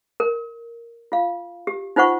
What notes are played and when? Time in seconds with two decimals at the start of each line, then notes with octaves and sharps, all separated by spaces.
0.20 A#4
1.12 F4 F5
1.67 G4
1.96 D#4 F4 C5 F#5 C#6